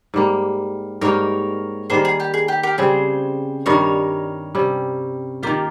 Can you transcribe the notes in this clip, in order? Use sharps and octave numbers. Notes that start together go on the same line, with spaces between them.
G#2 G3 A#3
G#2 G3 A#3 D#4 A#4 C#5
D#3 G3 A#3 G#4 C5
G#4
G4
G#4
G4
G4 A#4
C#3 G3 C4 G#4 C5
G2 D#3 G3 A#4 C#5
C3 G3 C#4
D#3 A#3 F4 G4